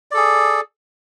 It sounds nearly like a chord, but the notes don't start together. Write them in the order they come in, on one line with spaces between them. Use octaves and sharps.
D5 A4 G#4